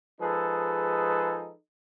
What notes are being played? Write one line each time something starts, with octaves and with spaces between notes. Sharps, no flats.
F3 G#3 D#4 G#4 A4 B4